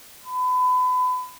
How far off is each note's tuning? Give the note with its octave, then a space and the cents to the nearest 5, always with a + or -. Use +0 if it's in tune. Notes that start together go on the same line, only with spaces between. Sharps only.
B5 +30